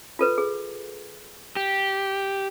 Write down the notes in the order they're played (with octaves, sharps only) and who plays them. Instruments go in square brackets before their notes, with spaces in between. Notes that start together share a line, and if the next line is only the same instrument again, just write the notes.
[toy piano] F4 A4 B4
G#4
[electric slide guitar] G4